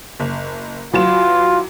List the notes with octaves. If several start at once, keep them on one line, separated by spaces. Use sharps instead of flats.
F#1
E3 F#3 F4 E7